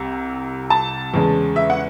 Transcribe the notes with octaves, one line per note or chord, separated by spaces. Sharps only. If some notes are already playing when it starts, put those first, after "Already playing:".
Already playing: C2 C3
A5
E2 C#3 G#3
E5
F#5